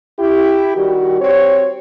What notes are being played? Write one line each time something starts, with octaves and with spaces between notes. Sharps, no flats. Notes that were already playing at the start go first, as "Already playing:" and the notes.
E4 G4
D#3 G3 F#4
C4 G4 C#5